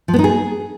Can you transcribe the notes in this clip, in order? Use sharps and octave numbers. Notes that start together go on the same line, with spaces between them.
F3
B3
D#4
G#4